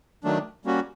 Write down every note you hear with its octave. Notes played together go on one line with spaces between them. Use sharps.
D#3 F#3 A3 D4
G3 A#3 C#4 F#4